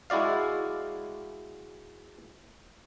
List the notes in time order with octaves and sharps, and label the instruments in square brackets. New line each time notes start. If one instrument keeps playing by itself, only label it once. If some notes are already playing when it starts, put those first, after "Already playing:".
[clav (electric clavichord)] G#3 E4 F#4 D5 F5